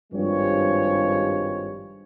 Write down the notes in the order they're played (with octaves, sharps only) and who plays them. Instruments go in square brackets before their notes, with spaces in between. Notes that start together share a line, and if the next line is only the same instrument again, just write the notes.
[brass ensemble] G#1 G2 F3 G#3 G4 C#5